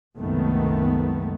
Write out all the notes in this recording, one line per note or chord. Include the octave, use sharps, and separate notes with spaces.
F#1 C2 D#3 G#3 A3 B3